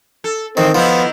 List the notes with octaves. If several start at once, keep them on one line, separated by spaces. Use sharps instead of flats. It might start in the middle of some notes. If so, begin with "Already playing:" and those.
A4
D#3 E3 C4
D#3 F3 B3 D#4 E4